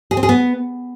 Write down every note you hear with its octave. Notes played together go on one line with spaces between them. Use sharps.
G#4
C4
G#4
B3